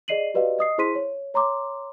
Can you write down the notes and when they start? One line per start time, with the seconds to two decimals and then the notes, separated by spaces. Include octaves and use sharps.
0.08 G#4 D5 D#5 C7 D#7 F#7
0.34 F#4 G4 B4 D5 D#5 F5
0.59 D#5 D#6 C7
0.78 E4 G#4 C5 C6 B6 D#7
0.95 C#5
1.34 C#5 A#5 C6 D6